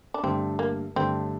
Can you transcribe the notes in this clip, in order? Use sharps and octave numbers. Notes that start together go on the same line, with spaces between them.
D4
G2 D3 A3 C4
A#3
G2 D3 A3 C4